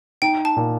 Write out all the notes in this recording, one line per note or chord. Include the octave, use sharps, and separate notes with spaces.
D#4 G5
A5
A#2